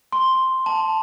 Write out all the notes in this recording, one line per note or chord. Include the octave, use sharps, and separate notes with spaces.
C6
A5